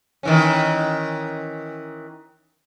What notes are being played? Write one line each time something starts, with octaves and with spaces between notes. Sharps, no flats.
D#3 E3 C#4